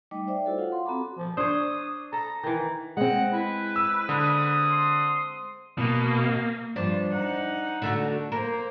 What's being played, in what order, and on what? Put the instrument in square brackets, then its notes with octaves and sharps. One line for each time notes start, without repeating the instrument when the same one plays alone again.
[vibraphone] G3 A3 D#4 D#5 G5 D6
C5 D5 E5 G5
E4 F#4 A4 C#5
F4 F5 F#5
C6
C4 F#4 A4 A#5 B5 D6
[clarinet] F3
[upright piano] D4 [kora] C5 C#5 [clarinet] D#6
[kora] A4 [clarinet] A#5
[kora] D#3 E3
[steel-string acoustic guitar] G#3 C4 [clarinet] F#5
[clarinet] E4 [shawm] B4
[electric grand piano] E6
[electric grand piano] D3 [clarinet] D#6
[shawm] C6
[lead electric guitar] B2 [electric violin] A#3
[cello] G2 F3 [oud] D4 C5
[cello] D#4 F#5
[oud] D3 A3 F#4
[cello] A#3 C5 [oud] A#4